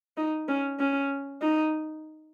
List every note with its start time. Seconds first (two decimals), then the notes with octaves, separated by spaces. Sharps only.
0.17 D#4
0.49 C#4
0.79 C#4
1.42 D#4